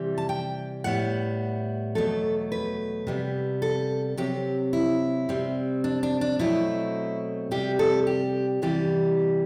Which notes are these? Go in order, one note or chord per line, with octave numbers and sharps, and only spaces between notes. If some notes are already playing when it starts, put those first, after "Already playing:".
Already playing: C3 E3 G3
A5
G5
A2 G3 B3 F#5
E2 B2 F#3 A3 A4
B4
C3 G3 B3
A4
C3 F#3 C4 G4
E4
C3 G3 C4
D4
D4
D4
B2 F#3 A3 C4 E4
C3 G3 C4 G4
A4
G4
E2 C3 E3 G3 B3 G4